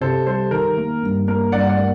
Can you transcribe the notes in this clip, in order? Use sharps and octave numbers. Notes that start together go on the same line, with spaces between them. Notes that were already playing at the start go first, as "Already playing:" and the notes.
C3 A4 C5
G3 A4 C5
D#3 A#4
A#3
G2
A#3 A#4
G2 D5 F#5
D5 F#5
A#3